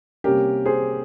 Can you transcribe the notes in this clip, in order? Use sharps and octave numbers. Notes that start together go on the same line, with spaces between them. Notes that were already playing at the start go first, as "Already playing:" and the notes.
C3 G3 A#3 C#4 G4 A#4
G#4 C5